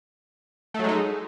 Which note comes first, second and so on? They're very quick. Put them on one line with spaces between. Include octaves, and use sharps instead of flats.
A3 F#3 G#3 D#4